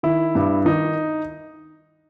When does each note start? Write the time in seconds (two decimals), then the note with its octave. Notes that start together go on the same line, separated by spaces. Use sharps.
0.03 D#3 E4
0.35 G2
0.65 D#3 D#4